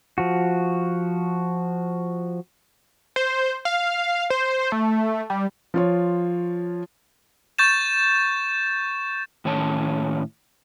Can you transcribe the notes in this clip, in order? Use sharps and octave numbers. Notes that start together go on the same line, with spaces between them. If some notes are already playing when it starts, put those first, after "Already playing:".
F3 F#4
C5
F5
C5
A3
G3
F3 F4 C#5
C#6 G6 A6 E7
A2 D#3 C#4 C#5 A5